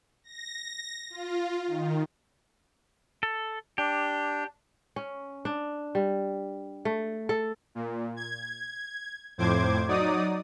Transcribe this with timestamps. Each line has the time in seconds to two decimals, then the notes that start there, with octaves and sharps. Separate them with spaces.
0.24 A#6
1.10 F4
1.67 D#3
3.23 A4
3.78 D4 G4
4.96 C#4
5.45 D4
5.95 G3
6.85 A3
7.29 A4
7.75 A#2
8.16 G#6
9.38 F2 A2 C5 D6 G#6
9.87 F#3 D#4 D5 D#6